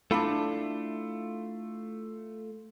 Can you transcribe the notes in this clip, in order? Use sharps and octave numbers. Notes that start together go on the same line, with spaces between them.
A3 D4 E4 F4